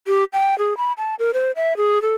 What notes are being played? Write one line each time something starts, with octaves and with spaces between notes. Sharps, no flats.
G4
G5
G#4
B5
A5
A#4
C5
E5
G#4
A4